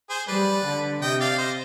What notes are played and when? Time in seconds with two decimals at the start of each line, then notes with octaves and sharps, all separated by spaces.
0.10 G#4 C5
0.28 G3 B4 D5
0.65 D3
1.02 C3 D#5 G5
1.21 D5 F5
1.38 C5 D#5